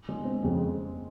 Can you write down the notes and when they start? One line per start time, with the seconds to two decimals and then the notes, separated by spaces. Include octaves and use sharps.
0.09 G#3
0.25 C4
0.43 F2 C#3 G#3